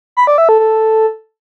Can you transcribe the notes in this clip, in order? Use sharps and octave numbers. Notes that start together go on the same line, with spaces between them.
B5
D5
E5
A4
A4